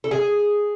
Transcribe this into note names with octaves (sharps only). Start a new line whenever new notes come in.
A4
G#4